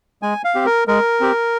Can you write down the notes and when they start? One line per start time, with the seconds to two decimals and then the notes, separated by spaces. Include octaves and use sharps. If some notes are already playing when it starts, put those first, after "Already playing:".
0.22 G#3 G#5
0.44 F5
0.55 C4 G4
0.66 A#4
0.88 G#3 A#4
1.20 C4 G4